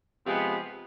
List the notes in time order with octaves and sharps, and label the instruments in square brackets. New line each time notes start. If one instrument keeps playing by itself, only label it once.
[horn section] C3 F3 G#3 B3